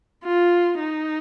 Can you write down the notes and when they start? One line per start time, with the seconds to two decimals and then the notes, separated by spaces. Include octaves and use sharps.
0.24 F4
0.80 D#4